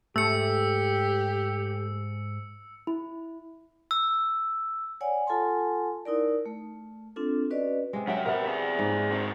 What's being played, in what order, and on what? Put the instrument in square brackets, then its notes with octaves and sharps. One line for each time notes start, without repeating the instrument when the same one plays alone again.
[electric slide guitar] G#2 G#4 A5 [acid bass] A3 [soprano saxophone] G4 [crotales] E6 C#7
[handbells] E4
[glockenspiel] E6
[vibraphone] C#5 D5 F#5 G#5
F4 A4 F#5 G#5 A5 C6
D#4 E4 A#4 D5
A3
C4 D4 F4 A4
C#4 F#4 B4 D5 D#5
[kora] C3 G#3
[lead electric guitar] F#2 E5 [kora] F#3 G5
[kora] C3 B3 [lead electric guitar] A#4 E5
[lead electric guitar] G#4 E5
[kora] G#2
[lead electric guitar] C4 F#4